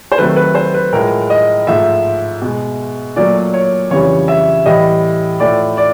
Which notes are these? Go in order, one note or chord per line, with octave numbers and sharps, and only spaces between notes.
C5
C3 D#3 F#3 A3 B4
B4
C5
B4
A2 F3 G#3 A#4
D#5
G#2 F3 A3 E5
B2 G#3
A#2 F#3 A3 D5
C#5
F2 C#3 E3 G3 C#5
E5
A2 E3 G3 D#5
A2 F3 A3 D5
D5